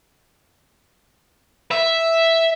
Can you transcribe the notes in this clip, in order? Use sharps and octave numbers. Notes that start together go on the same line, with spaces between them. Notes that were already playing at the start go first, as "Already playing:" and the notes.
E5